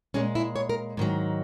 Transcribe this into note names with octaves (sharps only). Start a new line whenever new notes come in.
A#2 G#3 C#4
E4
C#5
A#4
G#2 D#3 F#3